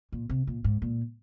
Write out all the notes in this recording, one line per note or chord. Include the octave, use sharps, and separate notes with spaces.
A#2
C3
A#2
G#2
A#2